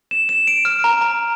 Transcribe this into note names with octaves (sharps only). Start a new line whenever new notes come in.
E7
E7
D7
F6
A#5
A#5